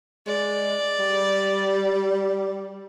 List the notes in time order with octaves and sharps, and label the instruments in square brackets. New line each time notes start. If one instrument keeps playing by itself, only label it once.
[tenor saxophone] G#3 [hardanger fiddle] D5
[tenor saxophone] G3